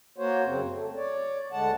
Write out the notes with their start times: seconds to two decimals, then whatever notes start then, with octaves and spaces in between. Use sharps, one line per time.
0.18 A#3 F#4 C5 C#5
0.45 F#2 C#3 C4
0.70 A3
0.96 C#5 D5
1.52 D2 D3 G#3 F#5 A5